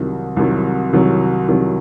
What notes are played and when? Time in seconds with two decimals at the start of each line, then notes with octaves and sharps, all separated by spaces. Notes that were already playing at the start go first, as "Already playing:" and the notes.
Already playing: C2 C3 D#3 F#3
0.36 C2 C3 D#3 F#3
0.93 C2 C3 D#3 F#3
1.48 C2 C3 D#3 F#3